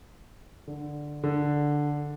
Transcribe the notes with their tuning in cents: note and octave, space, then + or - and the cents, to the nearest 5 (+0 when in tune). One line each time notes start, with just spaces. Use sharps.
D3 +5
D3 +0